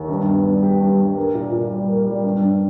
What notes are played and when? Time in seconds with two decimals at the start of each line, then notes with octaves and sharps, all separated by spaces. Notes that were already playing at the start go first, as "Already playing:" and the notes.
Already playing: D#2
0.09 G2
0.27 B3
0.45 G3
0.63 G4
0.81 G2
0.99 G2
1.17 A#3
1.35 A#2
1.52 A#2
1.71 G3
1.88 A#3
2.06 G3
2.24 G2
2.42 G2